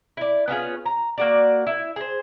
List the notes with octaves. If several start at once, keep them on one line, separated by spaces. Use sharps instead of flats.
E4 D5
B3 C#4 F4 G#4
A#5
A#3 F#4 D5
E4
G#4 C5